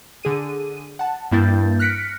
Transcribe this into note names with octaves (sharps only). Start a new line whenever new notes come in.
D3 G#4 D#7
F#5 A5
G2 A#3 E4 G6 A6
F6 F#6 A#6 B6 C#7 D7